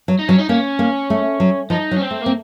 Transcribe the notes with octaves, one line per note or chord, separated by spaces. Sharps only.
F#3
D#4
F#3 C#4
D#4
A#3 C#4
A#3
A3
F#3
F3 D#4
F#3
C#4
C4
A3
A#3
C4